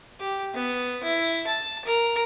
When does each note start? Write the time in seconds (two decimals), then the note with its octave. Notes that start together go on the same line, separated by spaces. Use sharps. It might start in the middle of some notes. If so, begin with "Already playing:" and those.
0.20 G4
0.54 B3
1.03 E4
1.47 A5
1.85 A#4